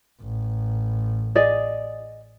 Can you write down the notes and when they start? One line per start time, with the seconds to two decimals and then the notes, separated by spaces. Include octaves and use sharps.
0.21 A1
1.35 G#4 D5 D#5